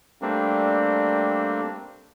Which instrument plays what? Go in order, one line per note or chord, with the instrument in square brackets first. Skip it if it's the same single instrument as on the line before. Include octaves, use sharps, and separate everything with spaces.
[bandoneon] G3 A3 A#3 C4 D4